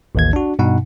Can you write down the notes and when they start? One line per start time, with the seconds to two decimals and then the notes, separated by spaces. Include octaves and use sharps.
0.15 A1 D#2 G#6
0.33 D4 F#4
0.59 G2 B2 D#4 F#5